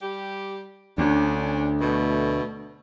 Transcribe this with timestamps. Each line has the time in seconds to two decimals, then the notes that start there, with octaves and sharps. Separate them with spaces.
0.02 G3 G4
0.98 D2 C#4 D4
1.81 B2 A3